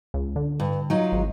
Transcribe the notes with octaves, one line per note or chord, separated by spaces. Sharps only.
C#2
D3
G2
F#3 D#4 F4
G#1